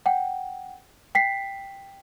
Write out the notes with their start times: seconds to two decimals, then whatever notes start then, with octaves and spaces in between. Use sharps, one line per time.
0.06 F#5 G5
1.15 G5 B6 C7